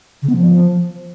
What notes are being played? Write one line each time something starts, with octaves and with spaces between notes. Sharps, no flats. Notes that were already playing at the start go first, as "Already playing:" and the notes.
C#3
B3
F3